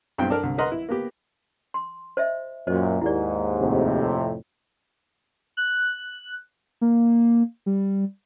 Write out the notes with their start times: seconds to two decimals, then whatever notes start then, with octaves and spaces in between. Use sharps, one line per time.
0.18 B1 G2 C4 E4 G5
0.30 D4 A4 A#4 D5
0.43 C2 D3
0.58 A#4 B4 D#5 F#5 A#5 C6
0.72 E4
0.89 A#3 B3 G4
1.74 C6
2.17 C5 D#5 E5
2.67 F#2 A#2 C5 D#5
3.02 D#2 G#2 E4 D5
3.60 F2 A2 C3
5.57 F#6
6.81 A#3
7.66 G3